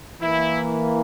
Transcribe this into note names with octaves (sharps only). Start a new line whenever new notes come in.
E3 A#3 E4